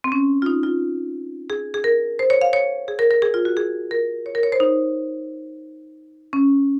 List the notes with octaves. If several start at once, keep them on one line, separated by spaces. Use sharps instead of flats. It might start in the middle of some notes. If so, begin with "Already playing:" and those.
C4
C#4
F4
D#4
F4
G#4
G#4
A#4
C5
C#5
F5
C#5
G#4
A#4
A#4
G#4
F4
F#4
G#4
A#4
C#5
A#4
C#5
C5
D#4
C#4